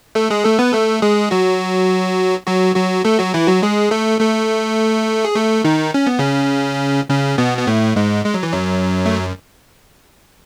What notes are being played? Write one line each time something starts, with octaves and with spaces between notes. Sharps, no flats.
A3 A4
G#3 G#4
A3 A4
B3 B4
A3 A4
G#3 G#4
F#3 F#4
F#3 F#4
F#3 F#4
A3 A4
F#3 F#4
E3 E4
F#3 F#4
G#3 G#4
A3 A4
A3 A4
G#4
A3 A4
D#3 D#4
C#4
B3
C#3 C#4
C#3 C#4
B2 B3
B3
A2 A3
G#2 G#3
G#3
F#3
E3
F#2 F#3
A3